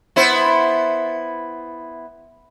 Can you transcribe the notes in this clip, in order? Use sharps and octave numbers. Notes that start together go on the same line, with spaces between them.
B3 E4 C5